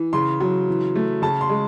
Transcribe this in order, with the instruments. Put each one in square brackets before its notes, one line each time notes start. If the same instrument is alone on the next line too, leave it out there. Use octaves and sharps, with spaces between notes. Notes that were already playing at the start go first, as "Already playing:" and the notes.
Already playing: [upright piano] E3
C#3 C6
F#3
E3
A3
C#3 A5
C6
G#3